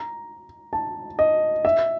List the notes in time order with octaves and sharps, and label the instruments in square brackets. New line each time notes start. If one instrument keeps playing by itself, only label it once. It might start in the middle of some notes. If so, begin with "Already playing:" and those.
Already playing: [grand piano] A#5
A5
D#5
E5